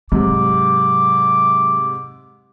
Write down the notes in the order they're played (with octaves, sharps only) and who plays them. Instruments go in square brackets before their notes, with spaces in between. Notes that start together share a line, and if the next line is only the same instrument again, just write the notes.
[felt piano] G#2 C3 [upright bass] F#3 [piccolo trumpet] D6